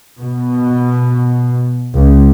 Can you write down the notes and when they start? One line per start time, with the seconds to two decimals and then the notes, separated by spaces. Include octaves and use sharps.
0.20 B2
1.96 C#2